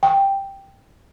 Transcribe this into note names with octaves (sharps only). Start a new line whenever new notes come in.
G5